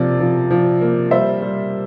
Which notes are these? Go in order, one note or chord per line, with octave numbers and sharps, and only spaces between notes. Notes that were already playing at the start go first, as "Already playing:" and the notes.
Already playing: C3 F3 A#3 D5
F3
F3
A#3
G3 C5 E5
G3